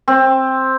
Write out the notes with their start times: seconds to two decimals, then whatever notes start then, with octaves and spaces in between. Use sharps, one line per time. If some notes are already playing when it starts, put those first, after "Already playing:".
0.08 C4